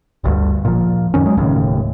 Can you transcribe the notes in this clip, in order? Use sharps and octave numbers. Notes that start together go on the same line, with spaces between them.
G1 D2 G2
A#2 F3
F#2 D#3 C#4
F#3 G#3
E1 D#2 A2 C#3